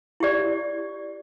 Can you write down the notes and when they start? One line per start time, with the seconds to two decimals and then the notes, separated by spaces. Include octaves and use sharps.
0.20 E4 G4 D5